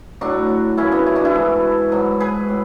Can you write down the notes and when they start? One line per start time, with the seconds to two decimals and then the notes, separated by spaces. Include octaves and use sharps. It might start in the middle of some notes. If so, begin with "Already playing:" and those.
0.21 A2 F#3 D4 F#4
0.77 F#2 C#3 E3 C#4 E4
0.92 B3 D4
1.06 C#4 E4
1.15 D4 F#4
1.25 E4 G#4
1.34 G#2 E3 F#4 A4
1.92 G#2 F#3
2.20 G#4 B4
2.48 A2